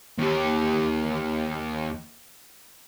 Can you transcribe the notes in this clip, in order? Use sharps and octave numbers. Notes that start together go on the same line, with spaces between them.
D#2 G4